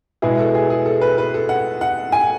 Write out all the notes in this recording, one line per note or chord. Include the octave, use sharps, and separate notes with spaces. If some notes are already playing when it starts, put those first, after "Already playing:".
B2 G#3 B3 E4 G#4
A4
G#4
G#4
A4
B4
B4
A4
F#5
F#5
G#5